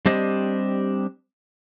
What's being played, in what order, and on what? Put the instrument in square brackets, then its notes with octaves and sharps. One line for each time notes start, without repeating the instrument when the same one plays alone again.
[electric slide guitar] G3 C4 D4 G4 C5 D#5